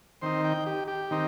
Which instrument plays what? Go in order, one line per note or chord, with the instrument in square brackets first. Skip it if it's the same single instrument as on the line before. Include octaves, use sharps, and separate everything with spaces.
[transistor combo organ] D#3 C4 D#4 C5
G5
G4
G4
D#3 C4 D#4